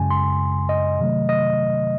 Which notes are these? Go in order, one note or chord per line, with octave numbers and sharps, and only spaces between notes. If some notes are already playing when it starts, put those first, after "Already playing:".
Already playing: F#2 C#3 G#3 G#5
C6
D#5
C3 D#3 F#3 A3
D#5